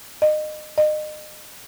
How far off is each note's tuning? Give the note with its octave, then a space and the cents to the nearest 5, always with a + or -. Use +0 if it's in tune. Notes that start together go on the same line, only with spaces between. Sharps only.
D#5 -30
D#5 -35